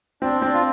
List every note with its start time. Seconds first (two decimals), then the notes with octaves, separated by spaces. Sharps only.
0.22 C4 D4
0.42 C4 D4
0.53 F4